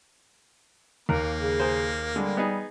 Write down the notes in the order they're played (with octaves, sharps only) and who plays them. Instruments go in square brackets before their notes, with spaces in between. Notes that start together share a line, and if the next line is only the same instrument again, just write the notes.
[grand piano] D#2 [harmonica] A#3 [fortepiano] A#4
[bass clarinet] C#3
[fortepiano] G#4 A#4 C5
[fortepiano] D3 G#3 [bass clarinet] G3
[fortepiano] B3 D#4 G#4